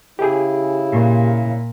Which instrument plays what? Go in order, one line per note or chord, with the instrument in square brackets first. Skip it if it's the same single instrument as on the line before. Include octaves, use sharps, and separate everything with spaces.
[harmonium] C#3 E4 [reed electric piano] G4 G#4
[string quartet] A#2